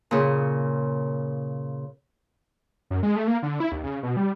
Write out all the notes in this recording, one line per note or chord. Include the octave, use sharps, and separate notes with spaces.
A#2 C#3
F#2
G#3
A3
A#3
D3
E4
D#2
C#3
B2
G3